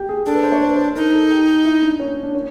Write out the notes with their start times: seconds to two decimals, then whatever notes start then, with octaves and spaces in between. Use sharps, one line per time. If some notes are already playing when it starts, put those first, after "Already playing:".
Already playing: G4
0.09 G#4
0.26 D4 A4
0.35 B4
0.43 C5
0.52 C#5
0.61 C5
0.69 B4
0.76 C5
0.95 D#4 A#4
1.13 A4
1.30 G4
1.65 E4
1.82 D4
2.00 C#4
2.23 D4
2.35 C#4